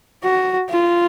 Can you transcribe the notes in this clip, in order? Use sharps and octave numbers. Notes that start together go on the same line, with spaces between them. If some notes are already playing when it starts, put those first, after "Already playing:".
F#4
F4